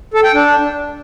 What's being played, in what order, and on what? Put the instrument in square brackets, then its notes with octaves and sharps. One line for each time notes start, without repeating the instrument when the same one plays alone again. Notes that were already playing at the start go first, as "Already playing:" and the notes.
[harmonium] A4
G5
D4